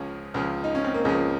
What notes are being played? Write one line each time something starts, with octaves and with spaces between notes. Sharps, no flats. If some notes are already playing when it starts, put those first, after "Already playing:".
Already playing: C#2 C#3 F3 C#4
C#2 C#3 F3
D#4
C#4
C4
A#3
C#2 C#3 F3 G#3